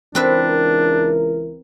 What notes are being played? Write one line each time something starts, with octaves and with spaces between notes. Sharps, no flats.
C#2 E3 C4 D4 A#4 B4 E5